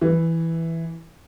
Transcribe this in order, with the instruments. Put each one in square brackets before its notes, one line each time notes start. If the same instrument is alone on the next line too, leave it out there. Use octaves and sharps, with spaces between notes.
[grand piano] E3